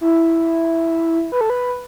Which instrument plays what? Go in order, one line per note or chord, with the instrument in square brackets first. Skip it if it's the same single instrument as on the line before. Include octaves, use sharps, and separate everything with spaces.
[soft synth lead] E4
B4
A4
B4